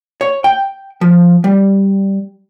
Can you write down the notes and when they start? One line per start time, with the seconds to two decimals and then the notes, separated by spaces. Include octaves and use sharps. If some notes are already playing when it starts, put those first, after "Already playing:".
0.21 C#5
0.44 G5
1.01 F3
1.44 G3